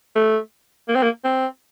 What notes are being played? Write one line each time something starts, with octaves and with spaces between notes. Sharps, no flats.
A3
A#3
C4
A#3
C4